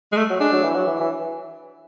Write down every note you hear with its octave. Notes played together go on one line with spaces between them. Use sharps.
G#3
A3
F#3
G#3 D4
F#3
E3
F#3
E3
E3